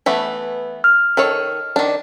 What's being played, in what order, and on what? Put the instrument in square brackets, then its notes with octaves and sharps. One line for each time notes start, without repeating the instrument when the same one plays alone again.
[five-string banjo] E3 A3 B3
[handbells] F6
[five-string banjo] D#3 A4 C#5
D#3 D4